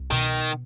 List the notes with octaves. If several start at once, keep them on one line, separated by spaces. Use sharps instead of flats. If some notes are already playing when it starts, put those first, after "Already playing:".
Already playing: C2
B2 D#3